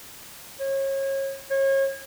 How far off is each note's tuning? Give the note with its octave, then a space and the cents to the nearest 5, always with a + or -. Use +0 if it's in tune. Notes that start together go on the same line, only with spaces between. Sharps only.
C#5 -30
C#5 -35